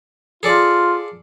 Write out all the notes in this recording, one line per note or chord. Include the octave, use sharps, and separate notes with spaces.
F4 G#4 A4 D5